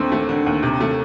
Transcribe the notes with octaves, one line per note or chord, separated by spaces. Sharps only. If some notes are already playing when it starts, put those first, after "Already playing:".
Already playing: D#2 D3 A3 C4
A3
D3
D#2
C3
A3